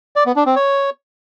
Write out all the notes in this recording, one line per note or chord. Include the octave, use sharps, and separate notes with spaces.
D5
B3
D4
C4
C#5